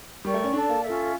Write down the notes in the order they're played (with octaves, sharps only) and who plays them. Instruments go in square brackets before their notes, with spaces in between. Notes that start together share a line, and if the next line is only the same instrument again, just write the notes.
[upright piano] G3 [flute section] A#4 D5 G5 C#6
[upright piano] A3
C#4
[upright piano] D4 [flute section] A4 D5 A5
[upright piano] A#3
[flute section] C#4 F4 A4 E5